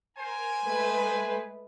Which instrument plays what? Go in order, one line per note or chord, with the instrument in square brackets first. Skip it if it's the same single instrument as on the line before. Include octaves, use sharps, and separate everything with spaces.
[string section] A#4 [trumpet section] C5 G#5
[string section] G#3 A3 B4